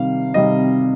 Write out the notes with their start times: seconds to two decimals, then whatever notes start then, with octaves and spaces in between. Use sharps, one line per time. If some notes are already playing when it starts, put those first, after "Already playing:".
Already playing: C3 D#3 G3 F5
0.34 C3 D#3 G3 D#5